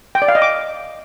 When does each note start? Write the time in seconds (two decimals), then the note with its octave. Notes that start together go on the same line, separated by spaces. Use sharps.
0.15 G5
0.22 D5
0.28 F5
0.35 D#5
0.42 D6